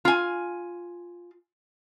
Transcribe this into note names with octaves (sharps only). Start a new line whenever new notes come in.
F4 G#5